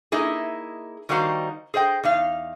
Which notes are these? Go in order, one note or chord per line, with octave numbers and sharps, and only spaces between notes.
A#3 D#4 E4 G#4
D#3 G3 A#3 D#4 F#4 C5
G#4 C5 D#5 G5
E2 D#4 F5